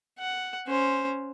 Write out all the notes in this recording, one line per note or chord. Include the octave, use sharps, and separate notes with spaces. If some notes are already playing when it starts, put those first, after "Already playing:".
F#5
C#4 C5